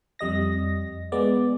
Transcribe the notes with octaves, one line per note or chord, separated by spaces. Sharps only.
F2 G3 D#5 A#6
G#3 B3 D5